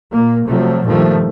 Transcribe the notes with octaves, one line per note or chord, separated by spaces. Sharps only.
A#2 A#3
C3 F3 F#3 A3
G2 A#2 D#3 F3 A3